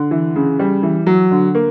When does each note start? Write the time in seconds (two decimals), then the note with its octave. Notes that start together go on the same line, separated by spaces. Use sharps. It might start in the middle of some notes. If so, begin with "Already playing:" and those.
Already playing: D3
0.11 E3
0.35 C#3
0.59 G3
0.83 E3
1.06 F#3
1.31 D3
1.55 A#3